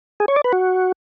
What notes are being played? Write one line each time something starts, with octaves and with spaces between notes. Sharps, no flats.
G#4
C#5
D5
B4
F#4